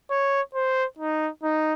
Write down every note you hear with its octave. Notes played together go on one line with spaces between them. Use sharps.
C#5
C5
D#4
D#4